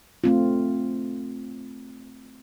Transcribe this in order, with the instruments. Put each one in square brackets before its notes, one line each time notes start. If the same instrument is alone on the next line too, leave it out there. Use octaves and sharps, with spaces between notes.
[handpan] A3 C4 F4